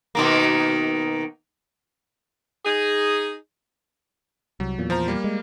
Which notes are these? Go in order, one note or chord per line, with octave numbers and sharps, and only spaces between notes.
B2 D#3 A#3
D#4 G#4
C2 F#3
E2 A#2
F3 C5 A#5
G3 A#3
G#3